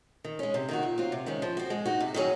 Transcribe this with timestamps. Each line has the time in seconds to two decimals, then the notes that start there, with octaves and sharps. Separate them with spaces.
0.24 D#3
0.39 G#3 C#4
0.54 C3
0.69 D#3 A#3 D#4 F#4
0.83 A#2
0.98 F#3 C4 F4
1.12 C3
1.26 D#3 G#3 C#4
1.42 F3
1.57 C4 F#4
1.70 G#3
1.85 D#4 F#4
2.00 C3
2.14 D#3 F#3 C#4 G#4